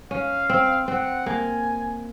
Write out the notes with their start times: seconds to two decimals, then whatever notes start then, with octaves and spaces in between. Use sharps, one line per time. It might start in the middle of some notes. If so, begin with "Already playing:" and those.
0.10 C#4 F5
0.50 C4
0.88 C4 F#5
1.26 A#3 G#5